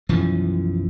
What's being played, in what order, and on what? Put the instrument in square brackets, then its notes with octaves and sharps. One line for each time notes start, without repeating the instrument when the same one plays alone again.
[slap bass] B1 F#2 E3 F3